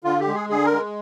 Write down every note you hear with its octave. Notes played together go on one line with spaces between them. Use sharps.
D3 F4
G4
G#3
G#4
D3 G#4
A#4
G#3